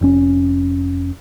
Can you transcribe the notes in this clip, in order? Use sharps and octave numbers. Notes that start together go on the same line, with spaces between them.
F1 C#4